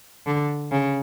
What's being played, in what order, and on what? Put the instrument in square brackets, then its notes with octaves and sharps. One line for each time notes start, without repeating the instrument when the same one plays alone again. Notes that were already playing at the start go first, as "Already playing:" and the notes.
[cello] D3
C#3